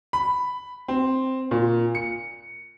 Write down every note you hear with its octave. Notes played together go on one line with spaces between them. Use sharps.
B5
C4
A#2
C#7